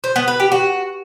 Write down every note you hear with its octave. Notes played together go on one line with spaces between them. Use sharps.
C5
B3
B4
G4
F#4